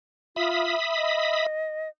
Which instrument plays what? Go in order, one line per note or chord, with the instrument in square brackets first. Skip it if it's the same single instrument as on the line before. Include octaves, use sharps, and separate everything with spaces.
[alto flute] F4 [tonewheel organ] E5 B5 D#6
[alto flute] D#5